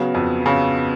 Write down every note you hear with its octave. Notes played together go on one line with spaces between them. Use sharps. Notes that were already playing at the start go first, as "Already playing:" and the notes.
Already playing: C#3 F#3 B3
F2
C#3